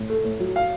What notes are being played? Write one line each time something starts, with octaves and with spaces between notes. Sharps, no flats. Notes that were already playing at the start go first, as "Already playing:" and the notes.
Already playing: A2
A3
A2
F#3
F5